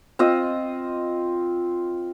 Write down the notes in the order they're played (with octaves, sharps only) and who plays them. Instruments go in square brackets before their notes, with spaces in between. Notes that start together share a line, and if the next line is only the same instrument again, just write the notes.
[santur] C4 F4 D#5